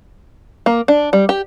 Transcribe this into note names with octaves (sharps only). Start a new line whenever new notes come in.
A#3
D4
G3
G4